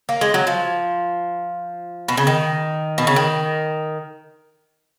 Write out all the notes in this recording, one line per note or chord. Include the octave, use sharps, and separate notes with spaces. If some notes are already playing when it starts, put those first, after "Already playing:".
A#3
G#3
F#3
F3
B2
C#3
D#3
B2
C#3
D#3